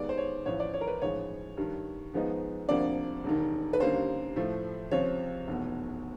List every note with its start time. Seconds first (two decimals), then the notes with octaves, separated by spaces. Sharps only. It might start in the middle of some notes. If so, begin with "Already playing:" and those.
Already playing: D#2 D#3 G#3 B3 D5
0.09 C5
0.18 C#5
0.45 A1 A2 F3 C#5
0.60 D5
0.74 C#5
0.81 A#4
0.87 B4
1.02 A1 G#2 F3 G#3 C#5
1.57 G2 D#3 G3
2.14 G#2 F3 G#3 B3 D#4
2.69 D2 C3 F3 A#3 D4 D5
3.24 E1 D#2 D#3
3.73 B4
3.80 D#2 D3 G3 A#3 C#4 C5
4.36 A2 F3 A3
4.91 C#2 C3 F3 C#5
5.48 F1 E2 B2